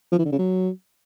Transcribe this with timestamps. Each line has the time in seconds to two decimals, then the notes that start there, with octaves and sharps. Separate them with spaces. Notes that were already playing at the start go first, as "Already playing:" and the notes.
0.12 F3
0.18 E3
0.25 D3
0.32 C#3
0.38 F#3